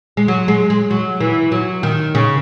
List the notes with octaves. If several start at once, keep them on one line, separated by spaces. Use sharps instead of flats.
G#3
F#3
G#3
G#3
F#3
E3
F#3
D#3
C#3